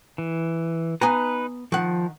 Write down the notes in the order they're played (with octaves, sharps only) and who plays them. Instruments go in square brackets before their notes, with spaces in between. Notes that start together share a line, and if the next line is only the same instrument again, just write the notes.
[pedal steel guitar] E3
[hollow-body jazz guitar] B3 G#5 A#5 [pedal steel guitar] D#4 B4
[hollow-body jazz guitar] D#3 F#5 [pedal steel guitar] F3